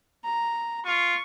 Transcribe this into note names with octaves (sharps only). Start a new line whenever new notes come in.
A#5
F4 C#6